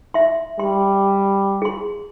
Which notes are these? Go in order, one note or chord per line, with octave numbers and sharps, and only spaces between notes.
E5 C6
G3 C6
G#4 C6